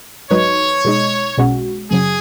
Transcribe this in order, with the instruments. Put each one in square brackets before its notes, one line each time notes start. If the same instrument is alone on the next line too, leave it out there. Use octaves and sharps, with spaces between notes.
[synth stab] G#2 F#3 D#4 B4 [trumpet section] C#5
[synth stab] B2 G#3 D#4
B1 B2 G#3 C#4 F#4
[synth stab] F#2 C#3 F#3 [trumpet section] G#4